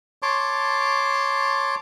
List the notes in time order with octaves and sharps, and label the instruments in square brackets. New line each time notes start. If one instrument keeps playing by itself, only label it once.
[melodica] C#5 A5 C6 D6